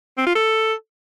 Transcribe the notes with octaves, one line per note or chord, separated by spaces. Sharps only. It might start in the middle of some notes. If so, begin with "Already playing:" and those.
C4
F4
A4